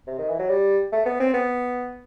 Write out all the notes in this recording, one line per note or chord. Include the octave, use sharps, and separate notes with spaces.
C3
D#3
E3
F#3
G3
A3
B3
C4
B3